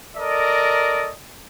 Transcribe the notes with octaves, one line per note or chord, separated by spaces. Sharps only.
A4 A#4 D5 D#5